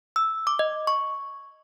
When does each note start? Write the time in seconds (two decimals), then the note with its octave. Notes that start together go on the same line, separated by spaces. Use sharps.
0.16 E6
0.47 D6
0.59 D#5
0.87 C#6